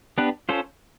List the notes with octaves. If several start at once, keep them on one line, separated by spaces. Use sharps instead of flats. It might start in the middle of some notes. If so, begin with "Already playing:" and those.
B3 D4 G4 B4
C#4 F4 A4 C5